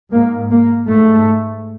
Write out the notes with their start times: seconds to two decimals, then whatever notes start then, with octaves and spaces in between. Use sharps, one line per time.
0.12 G#2 A#3
0.51 A#3
0.89 G#2 A3